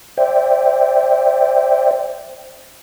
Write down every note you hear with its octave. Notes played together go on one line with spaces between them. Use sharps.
C5 D5 E5 G5